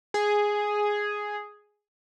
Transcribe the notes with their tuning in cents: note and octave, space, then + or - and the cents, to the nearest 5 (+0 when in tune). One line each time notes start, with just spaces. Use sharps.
G#4 +0